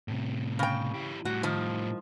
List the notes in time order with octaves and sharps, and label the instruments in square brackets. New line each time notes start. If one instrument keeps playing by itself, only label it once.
[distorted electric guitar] A2 C3
[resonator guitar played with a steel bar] C#3 G5
[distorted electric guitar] E3 G4
[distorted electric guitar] A2 G3 [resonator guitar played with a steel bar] F#4
[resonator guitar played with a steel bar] D#3 F3